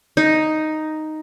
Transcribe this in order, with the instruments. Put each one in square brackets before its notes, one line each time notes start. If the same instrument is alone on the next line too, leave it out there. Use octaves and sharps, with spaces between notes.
[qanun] D#4